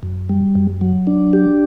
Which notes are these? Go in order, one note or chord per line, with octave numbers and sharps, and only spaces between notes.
F#2
G3
F#2
F#3
D4
G4